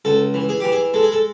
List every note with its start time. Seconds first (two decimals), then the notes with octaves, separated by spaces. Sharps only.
0.05 C#2 A4
0.34 E3
0.49 G#4
0.60 E3 G4
0.72 G#4
0.94 G#3 A4
1.03 G#4
1.12 A4